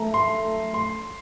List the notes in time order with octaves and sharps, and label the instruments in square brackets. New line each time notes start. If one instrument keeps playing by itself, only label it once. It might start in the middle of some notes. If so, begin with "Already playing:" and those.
Already playing: [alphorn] A3 [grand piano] A#5
[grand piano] C6
C6